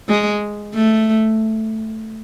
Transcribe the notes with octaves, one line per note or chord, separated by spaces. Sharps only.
G#3
A3